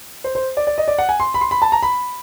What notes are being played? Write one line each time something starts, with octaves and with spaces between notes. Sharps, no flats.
C5
C5
D5
D5
D#5
D5
F#5
G#5
C6
B5
C6
B5
A5
A#5
B5